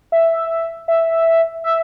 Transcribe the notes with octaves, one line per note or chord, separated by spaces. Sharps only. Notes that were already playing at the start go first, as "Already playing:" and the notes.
E5
E5
E5